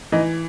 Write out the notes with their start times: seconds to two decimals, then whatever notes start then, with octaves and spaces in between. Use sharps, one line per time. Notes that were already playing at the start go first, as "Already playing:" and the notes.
0.12 E3 D#4